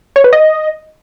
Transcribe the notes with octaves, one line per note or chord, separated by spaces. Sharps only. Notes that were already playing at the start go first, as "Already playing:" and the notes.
C#5
B4
D#5